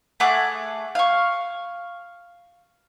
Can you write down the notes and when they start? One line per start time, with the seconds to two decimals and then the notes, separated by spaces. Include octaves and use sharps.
0.20 A3 G#4 F#5 D6
0.95 F5 C#6